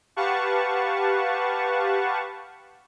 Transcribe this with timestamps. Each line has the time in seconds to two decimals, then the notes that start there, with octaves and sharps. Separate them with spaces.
0.16 G4 B4 F5 F#5 A5 C#6